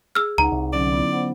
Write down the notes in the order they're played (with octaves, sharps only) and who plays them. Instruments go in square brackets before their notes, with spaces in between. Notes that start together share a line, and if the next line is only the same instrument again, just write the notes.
[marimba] G#4 [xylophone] E6 F6
[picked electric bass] C#2 [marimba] D#4 F#5 [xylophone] A#5
[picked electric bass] C2
[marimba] D3 F#3 C#4 [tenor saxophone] D5
[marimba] B3 E4
B3 C5 F#5